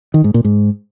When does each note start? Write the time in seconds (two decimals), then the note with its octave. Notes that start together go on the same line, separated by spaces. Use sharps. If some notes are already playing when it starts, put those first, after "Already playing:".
0.14 D#3
0.24 G#2
0.34 A#2
0.44 G#2